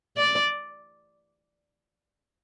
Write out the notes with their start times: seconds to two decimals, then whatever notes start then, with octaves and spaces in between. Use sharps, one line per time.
0.17 D5